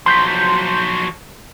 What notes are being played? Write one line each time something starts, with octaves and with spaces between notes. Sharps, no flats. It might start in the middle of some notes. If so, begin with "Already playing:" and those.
F3 F#3 C6 G6 B6